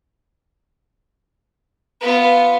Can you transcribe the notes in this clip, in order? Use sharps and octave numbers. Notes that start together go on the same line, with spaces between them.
B3 F4